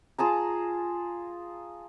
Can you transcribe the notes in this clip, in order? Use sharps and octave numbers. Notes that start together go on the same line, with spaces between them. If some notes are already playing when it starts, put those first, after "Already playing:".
F4 G#4 A5 A#5